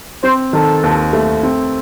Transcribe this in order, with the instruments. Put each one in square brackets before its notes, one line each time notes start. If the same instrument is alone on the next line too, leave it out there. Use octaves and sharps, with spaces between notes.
[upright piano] C4 [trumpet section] C5
[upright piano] D#3 [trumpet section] A4
[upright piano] D#2
A3
C4